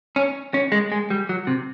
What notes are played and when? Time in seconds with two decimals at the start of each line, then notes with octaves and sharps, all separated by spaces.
0.16 C#4
0.54 C#4
0.72 G#3
0.92 G#3
1.10 G3
1.29 F#3
1.47 C3